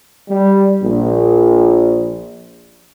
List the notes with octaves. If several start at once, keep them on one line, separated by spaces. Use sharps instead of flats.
G3
A#1